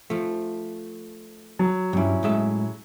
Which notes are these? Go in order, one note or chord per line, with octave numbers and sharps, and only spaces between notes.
F3 A3
F#3
G2 F#3 G3 C#4 E4
A2 G#3 E5